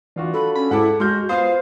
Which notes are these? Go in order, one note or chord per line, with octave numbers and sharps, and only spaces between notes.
E3 D4 F4 F#4
A4 B5
C#4 B5
G#2 E4 F#5 A5 D6
G#3 F#4 C6 F6 G6
B3 F4 C5 F5 D#6